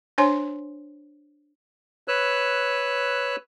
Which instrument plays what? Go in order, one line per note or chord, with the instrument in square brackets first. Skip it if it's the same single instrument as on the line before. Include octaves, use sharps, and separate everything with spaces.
[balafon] D4 C5 C#5 G#5 C6
[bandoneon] B4 C#5 E6 F#6